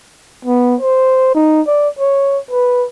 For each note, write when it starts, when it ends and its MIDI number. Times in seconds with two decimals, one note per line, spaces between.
0.45 0.76 59
0.81 1.34 72
1.35 1.61 63
1.67 1.89 74
1.99 2.39 73
2.51 2.87 71